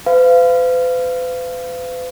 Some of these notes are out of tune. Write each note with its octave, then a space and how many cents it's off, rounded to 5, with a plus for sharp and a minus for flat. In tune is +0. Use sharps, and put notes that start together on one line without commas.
B4 +45 F5 -20